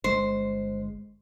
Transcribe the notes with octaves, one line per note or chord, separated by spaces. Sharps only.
G1 G#3 C5